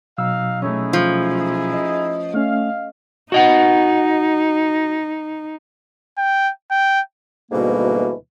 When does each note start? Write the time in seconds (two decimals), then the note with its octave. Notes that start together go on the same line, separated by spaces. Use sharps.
0.18 B2 F#3 D#4 F5 E6
0.62 A3 C#4 D#4 E4 G#4
0.93 F3
1.73 D#5
2.34 A3 C#4 F5
3.32 D#4 F#4 D#5 F#5
6.18 G5
6.71 G5
7.51 D2 G#2 B2 E3 G3 A#3